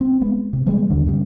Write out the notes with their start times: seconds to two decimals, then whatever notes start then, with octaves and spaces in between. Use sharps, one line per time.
0.01 C4
0.21 G#3 B3
0.53 C3
0.66 E3 G3 G#3 B3
0.90 D#2 D3
1.06 G2 C#3 G3